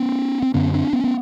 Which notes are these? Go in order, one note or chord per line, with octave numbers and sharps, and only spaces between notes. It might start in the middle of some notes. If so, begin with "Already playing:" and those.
Already playing: B3 C#4
C4
F#2 D3 B3 C#4
C4 D4
B3 C#4
B3